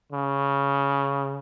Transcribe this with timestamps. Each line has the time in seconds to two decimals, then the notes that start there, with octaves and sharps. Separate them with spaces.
0.12 C#3